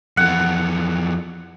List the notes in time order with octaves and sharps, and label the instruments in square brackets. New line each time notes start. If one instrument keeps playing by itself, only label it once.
[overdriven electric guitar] F2 E3 [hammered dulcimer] F#5